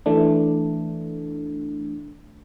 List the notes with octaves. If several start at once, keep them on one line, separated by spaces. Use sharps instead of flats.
E3 A3 D4